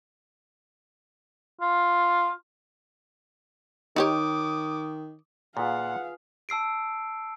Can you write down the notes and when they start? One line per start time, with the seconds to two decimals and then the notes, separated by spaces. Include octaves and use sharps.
1.61 F4
3.96 D#3 D#4 G4 C#5 D6 D#6
5.57 A#2 F4 G#4 B4 F5 F#5
6.49 A5 E6 C7 D7